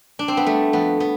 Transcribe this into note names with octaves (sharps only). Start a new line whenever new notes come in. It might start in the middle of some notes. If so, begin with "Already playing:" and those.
D4
C4
B3
G3 A3
F2 B3
B3